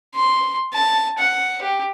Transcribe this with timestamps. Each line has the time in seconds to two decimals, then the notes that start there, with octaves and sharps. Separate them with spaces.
0.15 C6
0.73 A5
1.18 F#5
1.62 G4